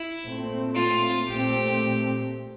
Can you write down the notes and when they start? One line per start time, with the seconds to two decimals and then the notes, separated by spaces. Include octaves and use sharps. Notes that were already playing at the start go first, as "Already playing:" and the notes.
Already playing: E4
0.24 A#2 A3 C4
0.76 F4
1.28 A#2 A3 C4 G4